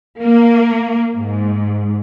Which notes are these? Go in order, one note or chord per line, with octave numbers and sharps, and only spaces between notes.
A#3
G#2